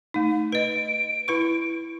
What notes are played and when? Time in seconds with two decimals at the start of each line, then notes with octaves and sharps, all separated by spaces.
0.14 A3 D#4
0.53 B4 D#5 D7
1.28 E4 B4 C#6